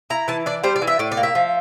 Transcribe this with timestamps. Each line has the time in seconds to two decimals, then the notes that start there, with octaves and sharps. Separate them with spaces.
0.10 E4 A#5
0.28 E3 A5
0.46 D4 D5
0.64 G3 C5
0.76 D5
0.82 E3
0.87 E5
0.99 A2 D5
1.12 D5
1.17 A#3
1.23 E5
1.35 F3